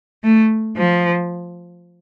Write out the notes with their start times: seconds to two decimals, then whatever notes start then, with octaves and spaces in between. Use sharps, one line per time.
0.24 A3
0.77 F3